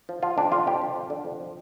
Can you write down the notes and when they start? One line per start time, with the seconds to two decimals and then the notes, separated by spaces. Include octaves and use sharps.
0.09 F3
0.23 F3 F4
0.38 F2 D4
0.52 D3 F4
0.67 F2 G4
0.82 F3
0.96 F2
1.10 D3
1.25 F2
1.40 F3